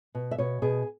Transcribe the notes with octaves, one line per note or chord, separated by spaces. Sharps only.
B2
E5
B2 C#5
B2 G#4